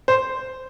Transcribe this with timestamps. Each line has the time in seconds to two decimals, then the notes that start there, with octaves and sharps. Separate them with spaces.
0.08 C5